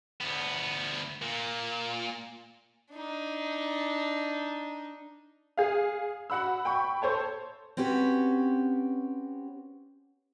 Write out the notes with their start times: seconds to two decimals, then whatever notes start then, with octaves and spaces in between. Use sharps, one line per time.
0.21 D2 B3
1.22 A#2
2.92 D4 D#4
5.57 G#4 F5
6.30 F#4 F#5 B5 E6
6.65 G5 B5 C#6
7.02 A4 C5 C#5 A5
7.77 C4 C#4 F#4 G4 B4